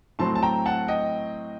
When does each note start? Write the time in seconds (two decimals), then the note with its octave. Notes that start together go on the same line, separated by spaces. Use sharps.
0.19 A2 F#3 C4 A5 C6
0.35 A5
0.42 G5 A#5
0.66 F#5 A5
0.88 D#5 G5